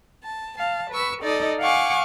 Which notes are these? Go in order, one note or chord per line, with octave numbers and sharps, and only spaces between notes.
A5
F5 A5
B4 C#6 E6
D#4 A4 D5 D#5
F5 F#5 G#5 C#6 D6